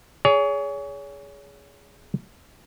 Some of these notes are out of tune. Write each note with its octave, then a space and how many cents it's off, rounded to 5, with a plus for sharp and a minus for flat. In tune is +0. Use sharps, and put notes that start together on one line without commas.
G#4 +0 C#5 +35